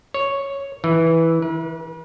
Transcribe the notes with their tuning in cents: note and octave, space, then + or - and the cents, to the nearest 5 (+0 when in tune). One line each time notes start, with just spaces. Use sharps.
C#5 +0
E3 -10
B4 -45